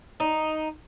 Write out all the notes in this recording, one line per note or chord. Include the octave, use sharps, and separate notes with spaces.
D#4